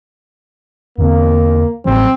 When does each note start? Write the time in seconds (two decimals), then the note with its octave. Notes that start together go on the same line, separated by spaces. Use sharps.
0.98 E2 D3 A#3 C4
1.85 A1 F#3 G3 C4